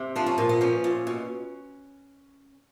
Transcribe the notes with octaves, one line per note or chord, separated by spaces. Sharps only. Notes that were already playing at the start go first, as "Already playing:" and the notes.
Already playing: C3
F3 D4
C#4
A#2
B3
F3 C#4
A#2
B2